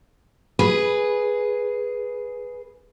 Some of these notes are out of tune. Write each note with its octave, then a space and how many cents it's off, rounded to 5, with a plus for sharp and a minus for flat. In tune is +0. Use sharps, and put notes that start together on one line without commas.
G#4 +0 B4 -5